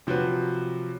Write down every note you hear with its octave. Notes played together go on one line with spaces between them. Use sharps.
C3 F3 F#3 F#4 B4